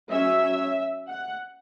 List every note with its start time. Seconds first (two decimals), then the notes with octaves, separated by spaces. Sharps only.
0.10 F#3 C#4 E5
1.09 F#5